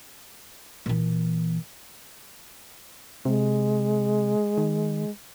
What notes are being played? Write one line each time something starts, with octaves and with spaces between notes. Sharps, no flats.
A#2 E3
C3 G#3
D#3